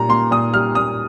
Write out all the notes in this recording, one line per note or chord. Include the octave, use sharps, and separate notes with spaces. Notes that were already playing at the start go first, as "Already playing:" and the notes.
Already playing: A#2 G3 A#5
A#3 C6
A#2 D#6
G3 F6
A#2 D#6